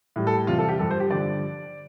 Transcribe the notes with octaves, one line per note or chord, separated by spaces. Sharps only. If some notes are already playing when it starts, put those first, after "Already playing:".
A2 G3
A4
E2 C3 G3 F4
A4
G4
G2 F3 A4
C5
G4
G2 D3 F3 D5